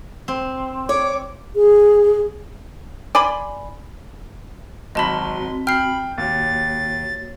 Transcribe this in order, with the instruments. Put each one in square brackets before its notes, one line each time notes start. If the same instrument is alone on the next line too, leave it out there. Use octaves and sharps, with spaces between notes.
[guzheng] C4
[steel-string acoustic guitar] C#5 [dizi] D6
[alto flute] G#4
[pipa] D5 G#5 B5 C6
[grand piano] G#1 F#3 B6 [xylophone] D#5 A5 B5 [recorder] C6
[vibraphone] C4 F#4
[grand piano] G5 [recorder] B5 [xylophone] F6 C7
[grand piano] D#2 [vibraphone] A#3 F#4 C#5 [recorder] A6